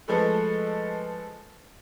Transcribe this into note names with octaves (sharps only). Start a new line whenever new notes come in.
F3 G#3 A3 A4 B4